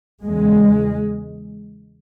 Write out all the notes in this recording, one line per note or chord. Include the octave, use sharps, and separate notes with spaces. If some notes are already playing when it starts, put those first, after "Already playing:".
E2 C#3 G#3